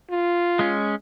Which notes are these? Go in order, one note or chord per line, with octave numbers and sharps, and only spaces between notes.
F4
G#3 C#4